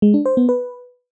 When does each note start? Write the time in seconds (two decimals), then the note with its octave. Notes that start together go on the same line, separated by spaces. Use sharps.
0.02 G#3
0.14 D4
0.26 C5
0.37 B3
0.49 B4